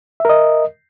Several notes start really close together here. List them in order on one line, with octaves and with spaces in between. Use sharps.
E5 A#4 D#5